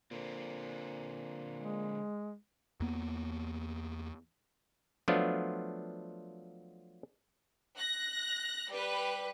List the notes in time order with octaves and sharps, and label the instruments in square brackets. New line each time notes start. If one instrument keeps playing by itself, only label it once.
[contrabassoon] A#2 [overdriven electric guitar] D3 C4
[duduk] G#3
[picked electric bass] E2 A#3 B3
[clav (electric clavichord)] F3 F#3 A3 B3 D4 F4
[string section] F#6 A#6
G3 B4